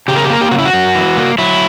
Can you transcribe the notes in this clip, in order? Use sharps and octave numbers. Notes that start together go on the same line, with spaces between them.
C#3 G4
A#4
G4
A#3 A#4
G4
C#3 F#4
E4
F#4
F#2
E3
A#3
F#3 E4